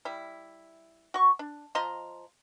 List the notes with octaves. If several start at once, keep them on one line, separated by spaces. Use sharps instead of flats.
G3 E4
F#4 C#6
D4
F3 D#5 A#5 C6